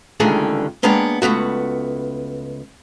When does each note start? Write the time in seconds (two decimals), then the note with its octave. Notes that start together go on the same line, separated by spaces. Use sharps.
0.20 C#2 G2 D3 D#3 A3 G#4
0.83 G#3 A#3 B3 D4 C#5 G5
1.22 C#2 A3 B3 F#4